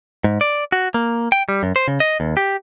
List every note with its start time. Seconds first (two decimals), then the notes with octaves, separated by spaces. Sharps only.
0.24 G#2
0.41 D5
0.72 F#4
0.94 A#3
1.32 G5
1.49 G3
1.63 F#2
1.76 C5
1.88 C#3
2.00 D#5
2.20 D#2
2.37 G4